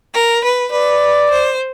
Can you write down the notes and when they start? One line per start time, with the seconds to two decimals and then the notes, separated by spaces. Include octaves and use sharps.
0.13 A#4
0.42 B4
0.71 B4 D5
1.30 C5